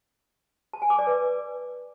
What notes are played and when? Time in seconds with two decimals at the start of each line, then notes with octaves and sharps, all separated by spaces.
0.73 A5
0.82 G#5
0.90 D6
0.99 D5
1.07 B4